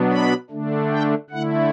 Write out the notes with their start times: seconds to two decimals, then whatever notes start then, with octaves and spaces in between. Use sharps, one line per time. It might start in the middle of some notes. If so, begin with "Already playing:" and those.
Already playing: B2 F#3 B3 D4
0.10 B5
0.50 D3 A3 D4
0.90 G5
1.30 D3 A3 E4 F#5